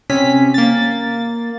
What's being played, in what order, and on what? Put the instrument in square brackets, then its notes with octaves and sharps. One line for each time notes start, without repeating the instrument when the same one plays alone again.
[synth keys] C3 C#4 B6
A#3 A6